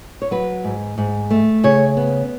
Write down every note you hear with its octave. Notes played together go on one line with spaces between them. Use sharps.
C#5
F#3 B4
G#2
G#2
A3
C#3 C#5
B3